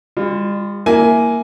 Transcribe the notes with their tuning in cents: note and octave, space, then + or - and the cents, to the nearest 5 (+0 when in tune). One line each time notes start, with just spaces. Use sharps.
G3 +45 F4 +0
A#3 +0 E4 +0 G#5 +10